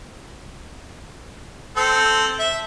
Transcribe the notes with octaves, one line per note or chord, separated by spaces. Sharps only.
C4 A4
E5